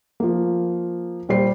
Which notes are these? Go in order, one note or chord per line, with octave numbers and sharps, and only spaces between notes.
F3 A#3
A#2 G3 C5 C7